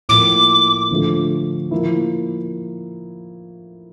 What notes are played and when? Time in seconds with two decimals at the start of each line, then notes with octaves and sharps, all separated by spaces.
0.09 A2 F3 A#3 D6
0.90 D3 F3 A3
1.71 F3 A#3 E4